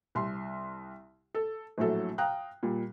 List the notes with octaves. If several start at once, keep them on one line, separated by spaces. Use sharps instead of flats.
C2 C6
A4
A#1 A2 F#3 A4
F5 G5 A#5 D#6 F#6
A#2 G3